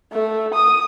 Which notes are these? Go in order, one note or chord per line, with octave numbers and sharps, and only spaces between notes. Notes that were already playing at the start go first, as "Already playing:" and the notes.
A3
D#6